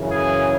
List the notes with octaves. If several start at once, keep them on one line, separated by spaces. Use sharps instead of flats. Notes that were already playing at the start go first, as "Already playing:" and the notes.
Already playing: F#2 C#3 E3
G#4